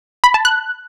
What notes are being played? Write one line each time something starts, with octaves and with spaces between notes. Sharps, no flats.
B5
A5
F#6